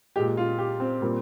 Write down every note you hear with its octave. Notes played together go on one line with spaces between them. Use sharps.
A#2 G#3 G4
F4
G4
C4
A#2 G3 A#3